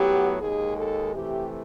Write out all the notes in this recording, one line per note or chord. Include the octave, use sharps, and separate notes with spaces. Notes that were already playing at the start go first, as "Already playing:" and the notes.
Already playing: A2 F#3 B3 G4
D#2 D#3 G#3 G#4
A4
C3 E3 A3 G4